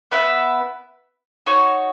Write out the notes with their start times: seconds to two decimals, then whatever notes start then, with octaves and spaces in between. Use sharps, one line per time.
0.11 B3 E4 B4 E5
1.46 D#4 F#4 C#5